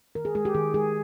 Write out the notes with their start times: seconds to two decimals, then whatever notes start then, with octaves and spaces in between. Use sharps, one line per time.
0.15 D#3 A#4
0.25 G#4
0.35 G#3 G#4
0.45 G4
0.55 D#3 G#4
0.74 G#3 G#4